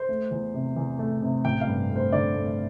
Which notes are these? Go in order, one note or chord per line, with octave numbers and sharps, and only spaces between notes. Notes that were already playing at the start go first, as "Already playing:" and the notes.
Already playing: C5
A3
E2
C3
E2
A3
C3
A1 G5
F5
G2
A3
C5
D3 D5
A3